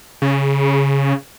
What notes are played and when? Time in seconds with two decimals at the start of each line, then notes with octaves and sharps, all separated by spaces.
0.22 C#3